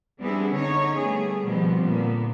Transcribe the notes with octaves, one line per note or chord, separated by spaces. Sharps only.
G3 B3 C4 D4 E4 G#4
D3 C#4 D#4 C#5
G3 A3 B3 G#4
B2 D#3 F3 G3 B3 C4
A#2 D3 B3